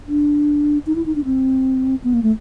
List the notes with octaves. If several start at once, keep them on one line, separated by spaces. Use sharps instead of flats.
D4
D#4
E4
D#4
D4
C4
B3
A#3
A3